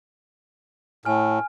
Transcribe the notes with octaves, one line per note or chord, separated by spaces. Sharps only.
A2 G#5 F6